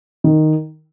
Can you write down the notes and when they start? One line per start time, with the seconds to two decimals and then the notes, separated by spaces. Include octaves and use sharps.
0.24 D#3